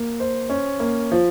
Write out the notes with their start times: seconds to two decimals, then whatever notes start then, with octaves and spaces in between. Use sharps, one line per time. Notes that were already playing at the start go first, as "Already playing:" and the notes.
Already playing: A#3
0.20 C5
0.49 C#4
0.80 A#3
1.12 F3